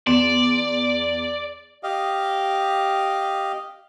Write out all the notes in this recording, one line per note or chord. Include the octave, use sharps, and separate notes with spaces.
E2 D5 C6 E7
G4 D#5 F5